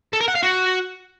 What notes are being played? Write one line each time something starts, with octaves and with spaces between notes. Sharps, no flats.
A4
A#4
F#5
F5
F#4